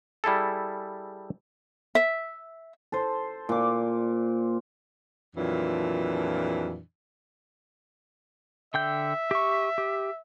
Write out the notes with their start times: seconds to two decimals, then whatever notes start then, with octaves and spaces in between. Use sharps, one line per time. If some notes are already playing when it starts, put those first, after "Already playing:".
0.24 G3 E4 G#4 A4
1.95 E5
2.92 A4 C5
3.49 A#2 D6
5.36 F2 A#2 E3 F#3 D4
8.74 D3 E5 G5 G6
9.31 G4 C#6
9.78 G4